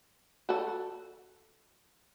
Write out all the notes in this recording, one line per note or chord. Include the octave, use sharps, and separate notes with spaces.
F#4 A4